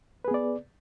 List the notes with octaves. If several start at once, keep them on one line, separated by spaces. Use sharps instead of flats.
B3 G#4 B4 D5